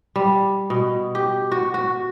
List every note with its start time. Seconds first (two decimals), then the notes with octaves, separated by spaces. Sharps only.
0.16 G3
0.70 B2
1.15 G4
1.52 F#4
1.74 F#4